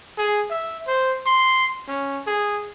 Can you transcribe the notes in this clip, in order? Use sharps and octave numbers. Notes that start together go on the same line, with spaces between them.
G#4
E5
C5
C6
C#4
G#4